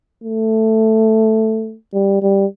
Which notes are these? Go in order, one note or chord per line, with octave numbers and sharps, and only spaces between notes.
A3
G3
G3